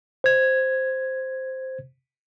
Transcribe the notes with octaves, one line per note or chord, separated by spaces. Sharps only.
C5 G#6